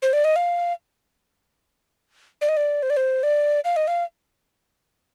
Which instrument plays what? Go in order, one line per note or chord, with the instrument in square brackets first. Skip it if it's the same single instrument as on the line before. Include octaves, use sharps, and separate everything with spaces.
[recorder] C5
D5
D#5
F5
D5
D#5
D5
C5
D5
C5
D5
F5
D#5
F5